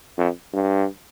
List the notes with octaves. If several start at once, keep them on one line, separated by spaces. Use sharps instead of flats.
F2
G2